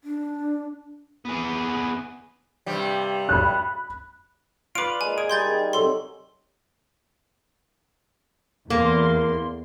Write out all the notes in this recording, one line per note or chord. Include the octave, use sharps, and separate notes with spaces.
D4
B3 G#4
G2 C3 G3
B5 F#6
F4 B4 D5 D6 D7
G#3 A#3 G#5
G#4 D7
G3 G#3 A#3 C6 G6 A6
D#3
C3 F#3 A4 C6
E2 A#3 C6